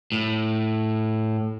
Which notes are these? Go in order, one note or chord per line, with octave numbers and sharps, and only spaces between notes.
A2